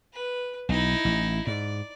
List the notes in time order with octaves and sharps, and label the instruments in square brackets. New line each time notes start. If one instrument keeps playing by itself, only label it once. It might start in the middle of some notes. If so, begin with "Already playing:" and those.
[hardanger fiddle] B4
[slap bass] B1 [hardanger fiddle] D#4 E4
[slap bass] A1
[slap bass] G#2 [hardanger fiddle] D5